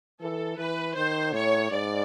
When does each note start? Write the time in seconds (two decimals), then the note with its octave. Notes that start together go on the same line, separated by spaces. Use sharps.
0.20 E3 A4
0.58 E3 B4
0.95 D#3 C5
1.33 A2 C#5
1.71 G#2 D5